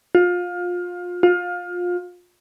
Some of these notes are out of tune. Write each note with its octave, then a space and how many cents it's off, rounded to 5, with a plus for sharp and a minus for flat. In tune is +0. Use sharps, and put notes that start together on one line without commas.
F4 +25
F4 +25